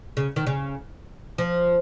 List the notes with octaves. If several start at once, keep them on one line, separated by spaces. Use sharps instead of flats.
C#3
D#3
C#3
F3